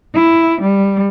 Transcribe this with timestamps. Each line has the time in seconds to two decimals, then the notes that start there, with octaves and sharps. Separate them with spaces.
0.14 E4
0.61 G3